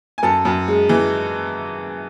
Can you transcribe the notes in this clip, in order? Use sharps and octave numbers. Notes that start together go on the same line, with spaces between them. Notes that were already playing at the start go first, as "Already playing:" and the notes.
G#5
F#2 A4 A5
F#2
G#3
E3